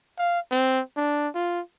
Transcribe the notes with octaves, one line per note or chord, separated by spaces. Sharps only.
F5
C4
D4
F4